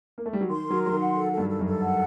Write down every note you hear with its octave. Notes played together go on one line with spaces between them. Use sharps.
A#3
A3
G3
F#3
D#3 C6
A#4
F#3
F#3 C6
D#3
F#5
A4
A4
G2
A4
F#2
A4
F#5